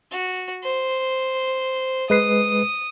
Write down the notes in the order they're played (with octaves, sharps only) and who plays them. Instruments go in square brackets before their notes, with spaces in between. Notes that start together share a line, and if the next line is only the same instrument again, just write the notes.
[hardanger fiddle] F#4
C5
[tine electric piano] G#3 B4 C7 [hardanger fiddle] D#6